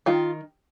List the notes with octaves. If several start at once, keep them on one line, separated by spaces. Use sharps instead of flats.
D#3 F4